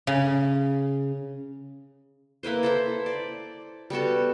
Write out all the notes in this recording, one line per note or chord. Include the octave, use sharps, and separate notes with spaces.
C#3
A#3 E4 B4 C5
A4 C5 E5
D5
G3 B3 F#4 A4